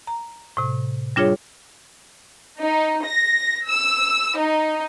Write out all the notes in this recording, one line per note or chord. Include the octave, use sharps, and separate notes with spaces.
A#5
A2 C3
G3 D4 F4 G#4 C#5
D#4
A#6
E6
D#4